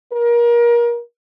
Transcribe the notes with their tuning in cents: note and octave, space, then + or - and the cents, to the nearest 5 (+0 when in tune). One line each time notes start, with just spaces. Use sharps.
A#4 +30